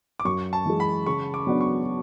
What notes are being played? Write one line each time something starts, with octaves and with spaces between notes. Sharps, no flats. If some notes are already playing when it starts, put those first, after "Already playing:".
D6
F#2 C#6
A5
E3 G#3
B5
C#3 C#6
D6
F#3 B3 D4
C#6